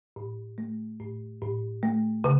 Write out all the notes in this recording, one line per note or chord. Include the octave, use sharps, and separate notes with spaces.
A2
A3
A2
A2
A3
C#3